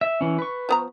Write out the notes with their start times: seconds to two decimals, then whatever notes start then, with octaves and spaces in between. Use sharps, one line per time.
0.01 E5
0.21 E3 C#4
0.39 B4 C#6
0.69 F3 B3 A#5